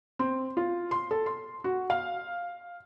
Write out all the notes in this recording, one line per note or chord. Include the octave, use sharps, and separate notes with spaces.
C4
F4
C6
A4
C6
F#4
F5